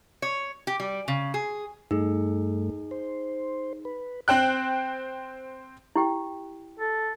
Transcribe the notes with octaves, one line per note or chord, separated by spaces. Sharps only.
C#5
G4
G3
C#3
G#4
G2 A3 D#4 G#4
C5
B4
C4 C5 G5 F#6
E4 G4 G5
A4